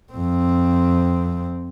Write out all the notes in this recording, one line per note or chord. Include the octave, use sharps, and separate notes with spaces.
F2 C4